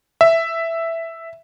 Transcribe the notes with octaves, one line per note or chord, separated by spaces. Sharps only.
E5